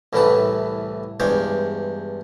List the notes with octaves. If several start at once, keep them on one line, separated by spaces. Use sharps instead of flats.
C2 A2 E3 A3 B4 A5
E2 G2 G#3 C5 C#5 D6